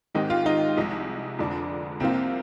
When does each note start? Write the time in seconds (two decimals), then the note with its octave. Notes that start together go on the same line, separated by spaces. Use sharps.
0.15 G#2 D#3 G#3 C4 D#4 G4
0.30 F4
0.46 D#4
0.77 C2 C3 F3 G#3 D#4
1.39 F1 F2 D3 G#3 D4
2.00 C2 C3 F3 A#3 C4 F4